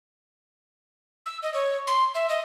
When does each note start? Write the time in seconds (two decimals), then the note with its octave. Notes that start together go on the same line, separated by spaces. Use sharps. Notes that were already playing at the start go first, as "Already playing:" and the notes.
1.26 E6
1.43 D#5
1.54 C#5
1.87 C6
2.15 E5
2.29 D#5